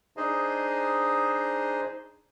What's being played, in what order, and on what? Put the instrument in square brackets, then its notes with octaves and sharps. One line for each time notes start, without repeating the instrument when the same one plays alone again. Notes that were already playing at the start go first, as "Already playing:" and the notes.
[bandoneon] D4 D#4 G#4 C5 D#5